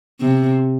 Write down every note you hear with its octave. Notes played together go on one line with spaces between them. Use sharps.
C3